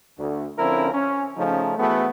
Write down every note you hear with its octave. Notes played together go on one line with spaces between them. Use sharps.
D2
D3 F3 C4 C#4 E4 A#4
C#4
C#3 F3 A3 C#4 D#4
E3 A3 B3 F#4 G#4 A4